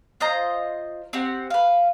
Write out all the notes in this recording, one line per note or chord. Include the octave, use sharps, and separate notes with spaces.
F4 C5 D#5 A#5
C4 F#4 G4 F#5
B4 F5